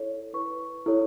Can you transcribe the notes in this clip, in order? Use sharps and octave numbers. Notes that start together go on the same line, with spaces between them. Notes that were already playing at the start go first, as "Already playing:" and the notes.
Already playing: E4 A4 C#5
E4 B4 C#6
E4 A4 C#5